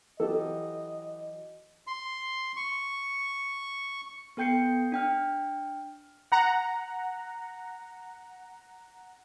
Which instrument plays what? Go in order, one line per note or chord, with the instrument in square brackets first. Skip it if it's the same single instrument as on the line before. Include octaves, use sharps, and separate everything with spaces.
[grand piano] E3 F#3 G4 [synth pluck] A4 [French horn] D#5
[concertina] C6
C#6
[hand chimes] B3 A4 G5 G6 C7 C#7
D4 G5 F6
[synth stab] F#5 A#5